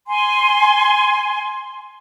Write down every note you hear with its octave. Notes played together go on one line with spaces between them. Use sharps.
G#5 C6